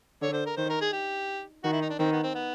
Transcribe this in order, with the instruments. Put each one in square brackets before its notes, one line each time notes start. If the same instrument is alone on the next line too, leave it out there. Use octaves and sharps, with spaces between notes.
[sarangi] D3 [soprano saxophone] C#5
[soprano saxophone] C5
A#4
[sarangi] D#3 [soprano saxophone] C5
[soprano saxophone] A#4
G#4
G4
[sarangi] D#3 [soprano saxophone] F#4
[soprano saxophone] E4
D#4
D4
[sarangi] D#3 [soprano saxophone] C4
[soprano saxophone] B3
C4
B3